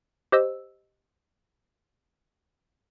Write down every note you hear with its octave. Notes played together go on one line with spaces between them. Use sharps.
G4 C5 D#5 E6